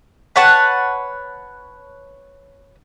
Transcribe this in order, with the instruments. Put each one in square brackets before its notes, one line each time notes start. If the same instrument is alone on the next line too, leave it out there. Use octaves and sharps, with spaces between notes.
[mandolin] B4 C#5 F#5 A5